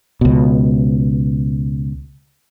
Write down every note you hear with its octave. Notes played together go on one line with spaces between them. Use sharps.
C#2 B2